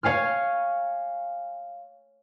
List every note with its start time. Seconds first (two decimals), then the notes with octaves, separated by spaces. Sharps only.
0.03 C#5 F5 G#5 F6